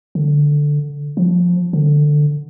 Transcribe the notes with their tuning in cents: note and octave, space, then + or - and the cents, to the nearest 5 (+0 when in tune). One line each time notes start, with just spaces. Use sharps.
D3 +0
F3 +15
D3 +10